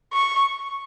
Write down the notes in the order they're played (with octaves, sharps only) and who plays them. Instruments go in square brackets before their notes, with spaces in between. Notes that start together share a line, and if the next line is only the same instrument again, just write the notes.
[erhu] C#6